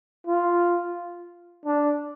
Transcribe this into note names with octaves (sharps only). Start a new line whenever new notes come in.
F4
D4